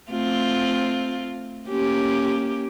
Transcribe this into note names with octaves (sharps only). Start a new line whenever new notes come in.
A3 C4 F4
A#3 C#4 G4